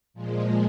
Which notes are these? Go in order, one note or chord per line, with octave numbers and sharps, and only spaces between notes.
A#2 F3 G#3